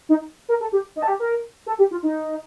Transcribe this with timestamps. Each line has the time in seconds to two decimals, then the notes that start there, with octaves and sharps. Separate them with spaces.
0.09 D#4
0.49 A#4
0.60 A4
0.72 G4
0.96 D#4
1.02 A4
1.08 G4
1.20 A#4
1.66 A4
1.79 G4
1.91 F4
2.03 D#4